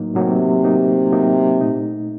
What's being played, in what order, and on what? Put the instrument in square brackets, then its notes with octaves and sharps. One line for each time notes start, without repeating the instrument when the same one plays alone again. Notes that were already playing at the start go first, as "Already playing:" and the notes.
Already playing: [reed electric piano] A2 F#3 A#3 D#4
[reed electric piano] A2 F#3 A#3 D#4 [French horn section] C3
[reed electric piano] A2 F#3 A#3 D#4
A2 F#3 A#3 D#4
A#2 A3 D#4